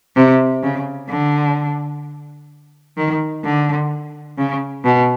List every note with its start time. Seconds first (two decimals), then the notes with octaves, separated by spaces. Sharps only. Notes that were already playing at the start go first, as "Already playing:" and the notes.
0.16 C3
0.63 C#3
1.10 D3
2.97 D#3
3.44 D3
4.38 C#3
4.84 B2